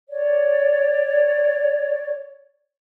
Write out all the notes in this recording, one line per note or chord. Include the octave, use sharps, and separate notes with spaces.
C#5 D5